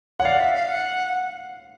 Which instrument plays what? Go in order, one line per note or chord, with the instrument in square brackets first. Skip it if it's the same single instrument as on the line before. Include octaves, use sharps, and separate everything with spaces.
[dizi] C#5 [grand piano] F#5
[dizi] D5 [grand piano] F5
[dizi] E5
F5
F#5